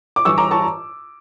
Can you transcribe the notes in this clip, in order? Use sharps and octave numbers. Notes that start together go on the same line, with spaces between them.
D6
G2 E3 C#6 E6
A#5 D6
A5 C#6